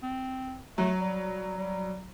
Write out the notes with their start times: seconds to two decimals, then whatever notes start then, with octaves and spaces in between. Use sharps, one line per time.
0.03 C4
0.78 F#3 A3
1.01 G3
1.58 G3